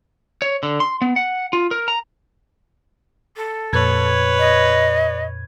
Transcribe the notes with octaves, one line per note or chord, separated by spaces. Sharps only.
C#5
D3
C6
B3
F#5
F4
A#4
A#5
A4
F2 A#2 B4 C#5 G#6
D#5